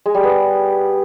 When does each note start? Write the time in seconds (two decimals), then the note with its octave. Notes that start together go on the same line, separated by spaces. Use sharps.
0.06 G#3
0.15 G3
0.24 B3